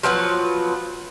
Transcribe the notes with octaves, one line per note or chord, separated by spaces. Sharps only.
F3 F#3 B3 B4